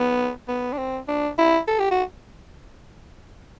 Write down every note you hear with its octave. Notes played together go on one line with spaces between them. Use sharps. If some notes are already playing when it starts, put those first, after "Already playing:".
Already playing: B3
B3
D4
C4
D4
E4
A4
G4
F#4